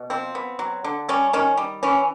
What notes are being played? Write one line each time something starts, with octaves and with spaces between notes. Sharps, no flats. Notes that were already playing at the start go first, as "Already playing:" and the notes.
Already playing: B2
F3 C4
B3
F#3
D3
G3 C#4
D#3 C#4
G3
E3 C#4